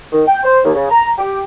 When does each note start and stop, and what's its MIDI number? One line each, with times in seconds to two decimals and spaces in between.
0.13 0.23 51
0.27 0.40 79
0.44 0.58 72
0.64 0.71 39
0.75 0.86 49
0.90 1.10 82
1.18 1.41 67